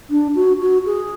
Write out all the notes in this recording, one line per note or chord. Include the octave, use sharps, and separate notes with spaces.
D4
F#4
F#4
G#4